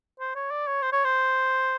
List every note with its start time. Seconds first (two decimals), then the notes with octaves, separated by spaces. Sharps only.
0.20 C5
0.35 C#5
0.51 D5
0.67 C#5
0.82 C5
0.92 C#5
1.04 C5